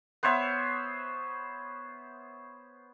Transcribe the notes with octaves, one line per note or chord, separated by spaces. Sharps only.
B3 C5 C#5 E5